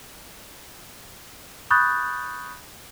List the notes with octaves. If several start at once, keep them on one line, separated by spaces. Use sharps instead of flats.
B5 C#6 D#6 F#6 G6 A6